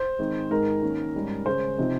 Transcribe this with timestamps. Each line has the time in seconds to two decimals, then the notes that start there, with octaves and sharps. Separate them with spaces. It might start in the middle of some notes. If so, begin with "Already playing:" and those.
Already playing: C5
0.19 D#3 G#3 C4
0.51 G#2 D#3 G#3 A#4
0.82 D#3 A#3 C#4
1.15 G#2 G3 C#4
1.46 C#3 G#3 C#4 C5
1.78 C3 F3 C4 D#4